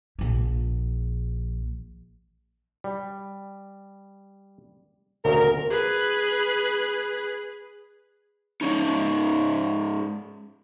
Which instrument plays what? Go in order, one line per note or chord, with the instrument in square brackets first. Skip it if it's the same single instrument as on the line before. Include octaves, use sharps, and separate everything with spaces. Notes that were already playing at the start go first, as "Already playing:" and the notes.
[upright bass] A#1 F3
[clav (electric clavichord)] G3
[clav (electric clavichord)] D2 A#2 C#3 [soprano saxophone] A#4
[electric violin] G#4 B4
[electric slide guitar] G#2 F3 C#4 D#4